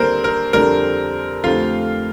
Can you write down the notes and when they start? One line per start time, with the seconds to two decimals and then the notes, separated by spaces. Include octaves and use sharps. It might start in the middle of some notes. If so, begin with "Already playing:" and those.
Already playing: D#2 D3 G3 A#3 C4 D4 A#4 C5
0.24 A#4
0.53 F2 D3 G3 D4 A#4
1.43 F2 D3 A3 C4 F4 G4 F5